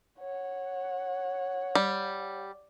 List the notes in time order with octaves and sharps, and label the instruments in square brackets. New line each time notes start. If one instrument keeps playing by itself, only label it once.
[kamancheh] C#5 F#5
[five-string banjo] G3